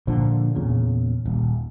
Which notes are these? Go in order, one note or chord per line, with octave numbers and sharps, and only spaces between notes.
A#2 D3 F3
E2 A#2 C#3
D#1